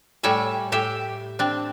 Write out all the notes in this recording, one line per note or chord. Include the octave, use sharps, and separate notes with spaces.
A2 G3 C#5 E5 G#5
A2 G4 E5
C4 D4